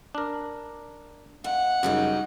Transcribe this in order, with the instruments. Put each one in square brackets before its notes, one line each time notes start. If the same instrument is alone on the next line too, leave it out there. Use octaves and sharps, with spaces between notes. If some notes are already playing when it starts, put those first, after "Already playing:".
[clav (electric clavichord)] D4 A#4
[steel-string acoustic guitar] F2 [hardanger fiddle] F#5
[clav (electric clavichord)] F#2 C#3 [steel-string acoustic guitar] F#3 G3 D#4